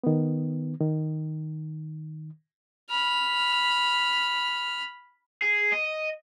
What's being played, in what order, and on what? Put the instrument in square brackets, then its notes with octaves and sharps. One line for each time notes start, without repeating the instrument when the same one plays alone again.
[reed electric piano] D#3 B3
D#3
[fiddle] B5 F6
[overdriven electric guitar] G#4
D#5